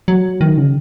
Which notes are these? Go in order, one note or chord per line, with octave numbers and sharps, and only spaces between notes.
F#3
D#3
C#3